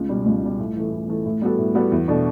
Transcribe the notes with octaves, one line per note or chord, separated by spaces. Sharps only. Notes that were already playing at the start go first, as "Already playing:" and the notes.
Already playing: C#2
B2 G3
C#2
B2 G3
A2
E3 A3
A2
E3 A3
A2
G3 B3 F#4 A4
A2
G3 B3 F#4 A4
E2
B2 A3 D4